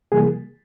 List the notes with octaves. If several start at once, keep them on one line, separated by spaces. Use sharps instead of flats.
C3 E3 G3 A#3 G#4